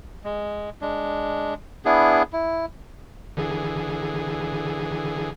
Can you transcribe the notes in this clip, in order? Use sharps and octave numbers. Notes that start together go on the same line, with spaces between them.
G#3
G#3 D4
B3 D4 E4 G#4
E4
D3 E3 G#4